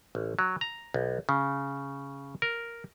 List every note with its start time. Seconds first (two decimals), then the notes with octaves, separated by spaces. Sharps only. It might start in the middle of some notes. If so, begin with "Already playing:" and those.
0.15 A1
0.39 F#3
0.61 A#5
0.94 B1
1.29 C#3
2.42 A#4